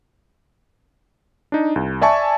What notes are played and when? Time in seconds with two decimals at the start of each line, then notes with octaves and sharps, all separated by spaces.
1.52 D4 D#4
1.76 C2
2.01 D5 E5 G#5 A5 C#6